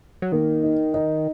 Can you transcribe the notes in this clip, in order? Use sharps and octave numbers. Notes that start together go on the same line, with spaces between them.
F#3
D#3 A#3
D#4
D#4